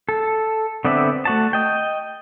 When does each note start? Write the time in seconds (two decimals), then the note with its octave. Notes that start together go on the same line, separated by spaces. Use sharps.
0.09 A4
0.85 D3 B3 C4 D5 E5
1.25 A3 F#4 A5
1.53 D#5 G5